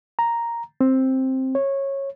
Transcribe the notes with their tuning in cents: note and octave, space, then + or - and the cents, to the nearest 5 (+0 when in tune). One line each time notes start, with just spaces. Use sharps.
A#5 +0
C4 +5
C#5 -15